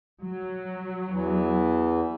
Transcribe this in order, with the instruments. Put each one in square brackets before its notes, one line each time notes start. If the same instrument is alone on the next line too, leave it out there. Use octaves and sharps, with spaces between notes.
[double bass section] F#3
[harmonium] E2 E3